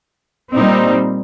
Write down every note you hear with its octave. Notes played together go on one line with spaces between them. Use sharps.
A#2 G3 C4 D#4